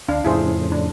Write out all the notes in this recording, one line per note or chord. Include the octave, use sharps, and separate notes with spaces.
D2 D4 F5
F2 A2 C#3 E4 G#4 C5
D4